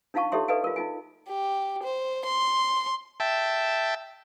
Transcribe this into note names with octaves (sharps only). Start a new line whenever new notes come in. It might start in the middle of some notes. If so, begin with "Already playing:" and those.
D4 D#4 F4 F5 A5 C#6
D#4 G4 A4 C#5 E5 C6
A4 B4 D5 D#5 F5 G#5
F4 A#4
D#4 F4 G#5
G4
C5
C6
E5 G5 A5